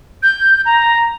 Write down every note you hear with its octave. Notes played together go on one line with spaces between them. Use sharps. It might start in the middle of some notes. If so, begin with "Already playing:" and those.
G6
A#5